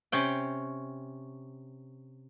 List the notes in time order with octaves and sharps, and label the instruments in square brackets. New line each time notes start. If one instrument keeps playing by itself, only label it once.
[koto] C3 C#4 G5